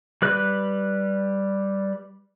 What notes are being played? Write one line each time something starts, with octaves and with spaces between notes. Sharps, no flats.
G3 B4 F#6